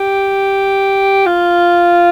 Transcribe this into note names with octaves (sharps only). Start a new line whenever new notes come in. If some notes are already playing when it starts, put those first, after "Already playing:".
Already playing: G4
F4